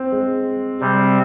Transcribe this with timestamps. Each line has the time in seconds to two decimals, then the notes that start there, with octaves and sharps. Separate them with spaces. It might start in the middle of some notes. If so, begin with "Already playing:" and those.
Already playing: C4
0.12 G#3
0.80 C3 G3 C4